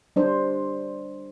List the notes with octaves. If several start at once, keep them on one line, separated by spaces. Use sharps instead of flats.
G3 D4 C5